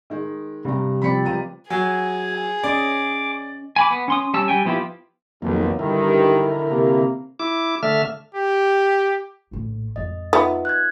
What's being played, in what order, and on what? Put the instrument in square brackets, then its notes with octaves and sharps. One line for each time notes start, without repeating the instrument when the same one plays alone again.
[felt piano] D#3 G#3
[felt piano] G2 A#5 [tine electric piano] C3 G3
[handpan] F3 C4 D5 [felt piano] B5 B6 C#7
[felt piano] C#2 A#5 D#7 [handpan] G3
[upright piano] F#3 [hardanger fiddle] G#4 [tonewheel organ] G#5
[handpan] C#4 D#5 [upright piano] D5 [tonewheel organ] D6
[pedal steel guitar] G#5 B5 D6
B3
C#4 C6 D#6
G3 C#4 A5 E6
G3 G5 G#5
F3 B3 E4 F4 G4
[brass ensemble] B1 [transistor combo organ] F2 D#3 A#3
[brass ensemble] G2 D#3 [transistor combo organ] D3 E4 A#4
[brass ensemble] C3 A#3
[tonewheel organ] E4 D6
D3 A3 E5 F6
[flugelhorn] G4
[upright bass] A#1 A2
[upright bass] F2 G#3 [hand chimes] D#5
[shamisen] B3 [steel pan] D#4 F4 E5
[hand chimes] F#6 G#6